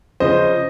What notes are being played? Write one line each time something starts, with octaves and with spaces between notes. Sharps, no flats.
C#3 F3 C5 D#5